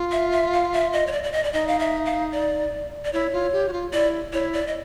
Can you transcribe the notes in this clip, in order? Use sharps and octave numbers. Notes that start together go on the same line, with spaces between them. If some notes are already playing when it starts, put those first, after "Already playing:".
Already playing: F4
E5
E5
F5
E5
D#5
C#5
D5
D5
D#5
D5
D#4 D#5
F5
E5
F5
D5
D5
E4 C#5
F4
G4
F#4
F4
E4 D5
E4 C#5
D5
D#5